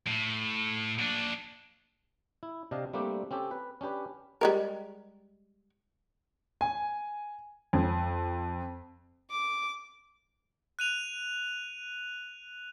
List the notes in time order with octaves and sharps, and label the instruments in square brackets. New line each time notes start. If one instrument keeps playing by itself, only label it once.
[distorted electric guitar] A2
A#2 D4
[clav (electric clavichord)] E4
C3 D4 D#5 F5
G3 A3 A#3 C4 D4 G4
C4 C#4 G4 A4
B4
C#4 D4 G4 B4
[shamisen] G3 G#3 A#4
[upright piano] G#5
F2
[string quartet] D6
[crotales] F#6 D#7 F7